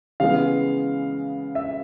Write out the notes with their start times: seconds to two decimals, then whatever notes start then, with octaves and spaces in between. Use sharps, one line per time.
0.20 C#3 E3 G#3 B3 F5
1.55 E5